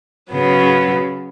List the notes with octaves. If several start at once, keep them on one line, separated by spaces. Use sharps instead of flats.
C#3 F#3 B3